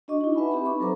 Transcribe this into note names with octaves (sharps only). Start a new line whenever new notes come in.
D4 F#4 D#5 C#6 D6
D#4 E4
B4 E5 F#5 G#5 A5 B5
C4 D#4 G4 E5 B5
B4 C#6 D6
F#3 A4 B4 C5 A#5 D6